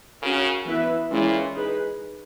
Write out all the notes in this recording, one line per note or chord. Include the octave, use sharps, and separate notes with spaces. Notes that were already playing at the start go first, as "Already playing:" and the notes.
C#3 C#4 F#4 A#4
E3 B3 E4 B4 E5
A#2 E3 G#3 C#4 E4
D#4 G#4 B4